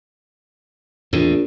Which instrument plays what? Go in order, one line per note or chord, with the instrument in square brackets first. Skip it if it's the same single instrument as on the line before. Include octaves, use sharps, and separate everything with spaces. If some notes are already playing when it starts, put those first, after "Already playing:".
[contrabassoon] A#1 [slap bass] E2 A2 C3